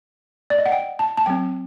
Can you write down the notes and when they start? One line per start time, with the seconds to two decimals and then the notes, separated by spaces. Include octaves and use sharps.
0.50 D5
0.58 D#5
0.66 F#5
0.72 G5
0.99 A5
1.17 A5
1.26 F#3 C4 G5